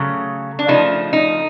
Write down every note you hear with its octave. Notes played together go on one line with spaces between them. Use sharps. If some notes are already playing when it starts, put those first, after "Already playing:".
Already playing: C#3 F#3 A3
D4
C#3 F3 A3 D#4
D#4